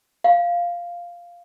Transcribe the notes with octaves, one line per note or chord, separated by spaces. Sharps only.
F5